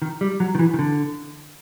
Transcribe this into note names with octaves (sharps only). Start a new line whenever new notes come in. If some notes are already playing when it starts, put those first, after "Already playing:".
D#3
G3
F#3
D#3
E3
D#3
D3